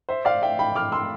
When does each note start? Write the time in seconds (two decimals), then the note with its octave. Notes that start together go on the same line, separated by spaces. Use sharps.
0.09 C5 E5
0.25 D5 F5
0.42 E5 G5
0.59 G5 B5
0.76 D6 F6
0.92 C6 E6